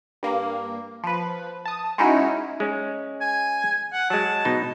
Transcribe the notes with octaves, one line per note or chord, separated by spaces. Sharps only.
G2 A#3
F3 B4
A5 D#6
G#3 C#4 D#4 E4 F#4
G#3 C#4
G#5
F#5
F#3 G#3 A5
B2 D#4